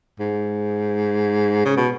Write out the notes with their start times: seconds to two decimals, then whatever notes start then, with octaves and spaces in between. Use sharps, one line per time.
0.20 G#2
1.65 C#3
1.77 B2